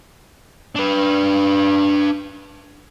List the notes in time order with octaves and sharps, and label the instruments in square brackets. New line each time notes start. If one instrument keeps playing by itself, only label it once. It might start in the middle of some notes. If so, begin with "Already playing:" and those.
[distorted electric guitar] D4 B4